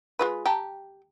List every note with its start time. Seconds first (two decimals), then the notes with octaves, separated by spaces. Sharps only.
0.19 G#3 F4 B4
0.46 G4 G5 A5 A#5